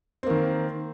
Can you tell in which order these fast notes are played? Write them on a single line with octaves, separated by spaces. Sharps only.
C4 A#3 D#3